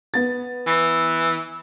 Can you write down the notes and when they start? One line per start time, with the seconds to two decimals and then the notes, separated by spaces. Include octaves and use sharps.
0.14 B3 A6
0.67 E3